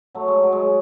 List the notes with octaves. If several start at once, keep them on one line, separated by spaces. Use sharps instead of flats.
F#3 A3
G#3
F#3
G#3